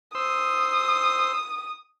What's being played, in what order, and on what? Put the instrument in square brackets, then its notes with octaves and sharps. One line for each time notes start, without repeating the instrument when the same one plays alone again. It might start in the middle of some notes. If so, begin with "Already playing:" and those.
[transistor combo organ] C5 C6 E6 [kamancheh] D#6